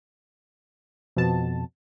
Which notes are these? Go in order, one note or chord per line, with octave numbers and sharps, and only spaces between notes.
F2 B2 A5